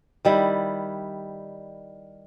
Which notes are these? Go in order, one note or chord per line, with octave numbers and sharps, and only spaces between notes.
D#3 G3 E4